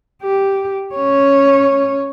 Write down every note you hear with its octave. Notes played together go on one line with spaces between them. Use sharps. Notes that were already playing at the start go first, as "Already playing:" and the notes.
G4
C#4 C#5